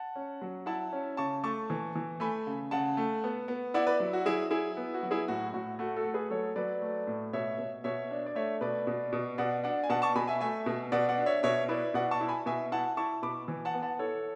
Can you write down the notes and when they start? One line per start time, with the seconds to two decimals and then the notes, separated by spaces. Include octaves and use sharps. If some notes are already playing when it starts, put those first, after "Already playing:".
Already playing: F#5 A5
0.16 C#4
0.42 F#3
0.66 E4 F#5 A5
0.93 C#4
1.17 C#3 A5 C#6
1.44 A3 A5 C#6
1.70 E3
1.95 E3
2.20 A3 G#5 B5
2.47 C#3
2.71 C#3 F#5 A5
2.97 A3
3.24 B3
3.48 B3
3.74 E4 D5 F#5
3.87 B4 D5
4.00 F#3
4.13 F#4
4.26 F#3 E4 G#4
4.51 E4 G#4
4.77 B3
4.94 F#4
5.03 F#3
5.11 E4 G#4
5.28 A2 F#4
5.53 A2 F#4
5.79 A3 F#4
5.96 F#4 A4
6.05 A3
6.14 G#4 B4
6.30 F#3 A4 C#5
6.56 F#3 B4 D5
6.82 A3
7.07 A2
7.33 B2 C#5 E5
7.59 B2
7.84 B2 C#5 E5
8.11 D4
8.26 D5
8.35 A3 C#5 E5
8.61 B2 B4 D5
8.87 B2
9.13 B2
9.38 B2 D5 F#5
9.64 D4 D5 F#5
9.84 G#5
9.89 B2 F#5 A5
10.02 A5 C#6
10.15 B2 G#5 B5
10.28 E5 G#5
10.41 A3 E5 G#5
10.66 B2
10.92 B2 D5 F#5
11.09 D5 F#5
11.18 D4
11.26 C#5 E5
11.43 B2 C#5 E5
11.69 E4 B4 D5
11.94 B2 D5 F#5
12.11 A5 C#6
12.21 E4
12.28 G#5 B5
12.46 B2 E5 G#5
12.72 E4 F#5 A5
12.97 E4 A5 C#6
13.22 B2 B5 D6
13.48 E3
13.65 F#5 A5
13.74 B3
13.82 F#5 A5
13.99 E4 A4 C#5